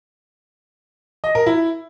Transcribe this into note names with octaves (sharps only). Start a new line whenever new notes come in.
D#5
A#4
E4